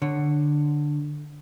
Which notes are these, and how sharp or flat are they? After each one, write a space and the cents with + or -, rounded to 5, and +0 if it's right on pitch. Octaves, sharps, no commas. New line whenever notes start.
D3 +10 C#5 +0